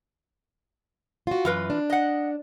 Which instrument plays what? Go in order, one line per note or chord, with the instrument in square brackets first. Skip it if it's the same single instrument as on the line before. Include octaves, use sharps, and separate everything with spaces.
[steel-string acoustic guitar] F4 F#4
[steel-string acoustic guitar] F#2 [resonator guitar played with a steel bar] E3 F4 B4
[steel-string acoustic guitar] D4
[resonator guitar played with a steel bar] D#5 F#5